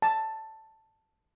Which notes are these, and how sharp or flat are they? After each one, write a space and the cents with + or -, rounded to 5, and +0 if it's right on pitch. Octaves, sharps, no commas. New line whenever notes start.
A5 +5